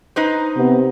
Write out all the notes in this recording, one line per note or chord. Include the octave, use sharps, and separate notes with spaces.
D#4 B4 C5
C3 B3